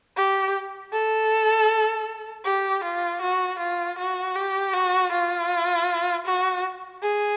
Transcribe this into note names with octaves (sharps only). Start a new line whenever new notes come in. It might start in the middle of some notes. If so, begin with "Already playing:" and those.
G4
A4
G4
F4
F#4
F4
F#4
G4
F#4
F4
F#4
G#4